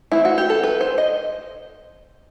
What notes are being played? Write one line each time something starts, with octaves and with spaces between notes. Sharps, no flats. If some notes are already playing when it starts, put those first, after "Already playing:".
E3 A3 C4 E4
F#4
G4
A4
B4
C5
D#5